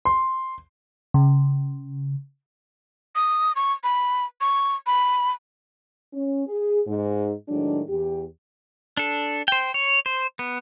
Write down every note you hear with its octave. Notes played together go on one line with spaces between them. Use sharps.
C6
C#3
D#6
C#6
B5
C#6
B5
C#4
G#4
G#2
A2 D#3 F#3 G#3 D4
E2 G4
D4 A4
C5 G5
C#5
C5
B3